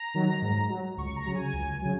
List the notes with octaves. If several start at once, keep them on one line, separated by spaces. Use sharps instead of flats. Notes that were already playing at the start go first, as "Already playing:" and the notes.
Already playing: A#5
D#3 F#3
G#2
F#3
C#2 C#6
A#5
C#3 F#3
G#5
C#2
C#3 F#3